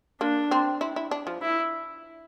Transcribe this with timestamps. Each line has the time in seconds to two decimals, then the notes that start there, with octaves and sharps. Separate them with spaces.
0.21 A#3 D4
0.51 C4
0.81 E4
0.96 E4
1.11 D4
1.27 F3
1.42 E4